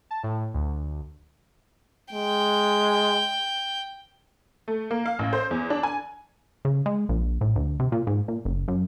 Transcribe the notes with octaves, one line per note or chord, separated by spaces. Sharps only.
A5
A2
D2
G#3 G5
A3
A#3
F5
A1
C5
E2
D4
G#5
C#3
G#3
A#1
A2
D2
C3
A#2
G#2
A#2
F#1
F#2